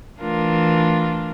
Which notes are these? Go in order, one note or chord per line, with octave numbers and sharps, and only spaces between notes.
E3 A3 D4 F4 A#4